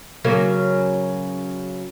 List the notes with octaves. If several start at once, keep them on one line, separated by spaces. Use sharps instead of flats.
C#3 F#3 A#3